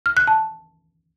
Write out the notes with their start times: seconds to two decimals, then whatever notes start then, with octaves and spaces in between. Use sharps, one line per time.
0.06 F6
0.17 F#6
0.27 A5